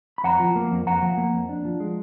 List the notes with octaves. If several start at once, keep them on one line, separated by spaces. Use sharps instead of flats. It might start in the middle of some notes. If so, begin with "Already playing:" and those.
B5
F2 F#5 A#5
F3
A#3
F2
F2 F#5 A#5
F3
A#3
F2
D4
F3
G#3